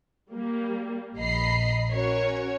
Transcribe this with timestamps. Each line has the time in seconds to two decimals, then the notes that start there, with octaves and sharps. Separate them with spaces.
0.33 G3 A#3
1.17 A#1 D#5 A#5 B5 C7
1.93 C#4 F#4 A#4 C#5